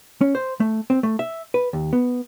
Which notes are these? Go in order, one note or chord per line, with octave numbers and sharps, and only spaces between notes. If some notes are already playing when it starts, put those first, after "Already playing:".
C#4
C5
A3
C4
A3
E5
B4
D#2
B3